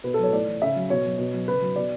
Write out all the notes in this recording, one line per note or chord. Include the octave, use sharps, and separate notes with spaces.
B2 B4
A4
F#3 C#5
A2 D5
E3
C#3 E5
F#3
B2 C#5
F#3
B2
F#3
C#3 B4
F#3
B2 D5